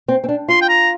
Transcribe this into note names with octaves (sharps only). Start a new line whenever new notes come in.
C4
C4
D4
F4 C6
G5
A#5